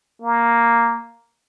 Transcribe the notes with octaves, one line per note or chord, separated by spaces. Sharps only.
A#3